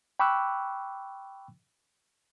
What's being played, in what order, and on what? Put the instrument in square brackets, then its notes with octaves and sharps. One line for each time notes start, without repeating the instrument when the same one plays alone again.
[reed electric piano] G5 B5 C#6 D6 E6 F#6